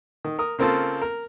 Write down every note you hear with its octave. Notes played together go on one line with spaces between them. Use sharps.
D#3
A#4 D#6
C#3 A#3 C4 F4 A4
A#4